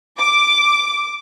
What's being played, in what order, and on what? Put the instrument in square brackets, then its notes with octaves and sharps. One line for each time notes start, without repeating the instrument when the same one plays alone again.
[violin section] D6